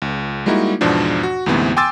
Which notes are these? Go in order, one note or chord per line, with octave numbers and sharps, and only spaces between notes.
C#2
G3 G#3 A#3 D#4 E4 F#4
E2 G#2 B2 F3 D4
F#4
D2 G#2 C3 E3 B3
G5 G#5 C6 D6 E6 A6